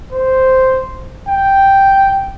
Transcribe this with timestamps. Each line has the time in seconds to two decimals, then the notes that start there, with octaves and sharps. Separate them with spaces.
0.12 C5
1.29 G5